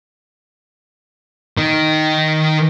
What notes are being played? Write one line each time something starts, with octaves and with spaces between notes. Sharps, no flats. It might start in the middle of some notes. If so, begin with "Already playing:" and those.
D#3 D#4